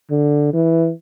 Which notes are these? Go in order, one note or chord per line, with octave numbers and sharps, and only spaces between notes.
D3
E3